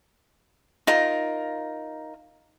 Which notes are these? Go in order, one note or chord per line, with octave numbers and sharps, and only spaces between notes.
D#4 F4 A#4